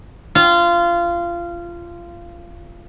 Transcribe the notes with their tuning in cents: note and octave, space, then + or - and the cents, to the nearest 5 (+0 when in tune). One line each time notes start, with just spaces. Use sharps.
F4 -20